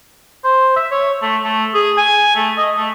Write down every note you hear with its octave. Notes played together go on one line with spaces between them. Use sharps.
C5
E5
C#5
A3
A3
G#4
G#5
A3
D#5
A3